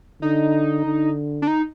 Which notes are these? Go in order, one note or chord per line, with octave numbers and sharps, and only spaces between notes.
D3 D#4
D3
D4
D#4